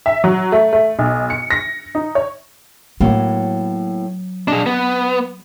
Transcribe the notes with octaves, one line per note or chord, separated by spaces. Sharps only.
E5
F#3
A3
A3
B1
C#7
A#6
D#4
C#5
A2 F#3 A#3 B3
D4 G#4 D#5
B3